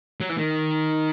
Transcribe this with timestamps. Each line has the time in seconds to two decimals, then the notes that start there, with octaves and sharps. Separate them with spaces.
0.20 F#3
0.29 E3
0.38 D#3